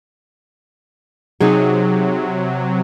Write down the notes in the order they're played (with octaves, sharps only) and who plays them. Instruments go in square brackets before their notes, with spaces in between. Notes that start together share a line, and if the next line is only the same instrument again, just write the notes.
[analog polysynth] C3 F#3 [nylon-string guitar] D#4 G#4